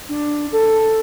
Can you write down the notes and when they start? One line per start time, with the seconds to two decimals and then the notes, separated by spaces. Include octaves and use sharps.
0.09 D4
0.52 A4